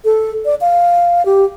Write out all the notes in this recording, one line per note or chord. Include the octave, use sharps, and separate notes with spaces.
A4
D5
F5
G4